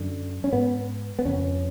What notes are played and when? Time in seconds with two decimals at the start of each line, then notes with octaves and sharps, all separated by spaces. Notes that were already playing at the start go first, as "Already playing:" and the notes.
Already playing: F#2 D3
0.44 C#4
0.52 G#2 B3
1.19 B3
1.25 F2 C#3 C#4